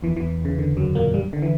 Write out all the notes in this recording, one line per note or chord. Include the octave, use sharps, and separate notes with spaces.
E2 E3
E2 E3
C#3
D3
F#2 F#3
A#2 A#3
G2 G3
D3
E3